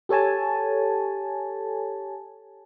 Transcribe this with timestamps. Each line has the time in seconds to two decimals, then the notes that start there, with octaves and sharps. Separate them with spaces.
0.09 G4 A4 C#5 G#5 A5